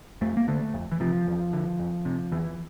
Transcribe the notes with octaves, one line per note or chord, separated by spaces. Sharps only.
F2 A3
A#3
D3 A3
F2
E3
C3 F3
E2
D3
F2
C3
E2 E3